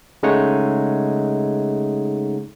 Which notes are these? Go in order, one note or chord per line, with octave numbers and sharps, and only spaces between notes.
C#3 G#3 A3 D#4 C#5 F#5